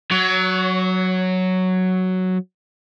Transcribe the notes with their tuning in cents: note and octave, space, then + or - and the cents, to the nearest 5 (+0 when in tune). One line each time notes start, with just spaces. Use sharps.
F#3 +0 C#5 +30